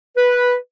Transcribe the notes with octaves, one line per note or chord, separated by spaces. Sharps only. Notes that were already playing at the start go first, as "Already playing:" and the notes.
B4